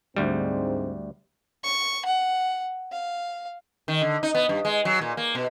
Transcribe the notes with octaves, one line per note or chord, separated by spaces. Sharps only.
D2 G#2 G3 C4
C#6
F#5
F5
D#3
D3
D#4
B3
G2
G#3
F#3
A#2
A#3
B2